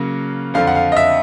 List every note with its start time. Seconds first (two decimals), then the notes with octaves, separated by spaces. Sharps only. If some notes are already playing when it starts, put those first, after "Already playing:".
Already playing: C#3 F#3 A#3
0.54 F2 D3 F3 F5
0.67 F#5
0.75 F5
0.92 D#5
0.97 E5